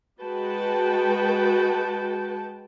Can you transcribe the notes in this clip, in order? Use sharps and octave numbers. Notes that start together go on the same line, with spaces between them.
G#3 F#4 B4 G5 A5